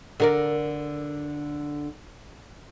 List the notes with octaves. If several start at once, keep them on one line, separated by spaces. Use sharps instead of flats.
D3 A#4 D5